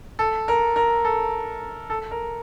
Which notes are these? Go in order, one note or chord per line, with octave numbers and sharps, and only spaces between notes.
A4
A#4
A#4
A4
A4
A#4